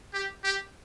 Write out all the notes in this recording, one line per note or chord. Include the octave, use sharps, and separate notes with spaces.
G4
G4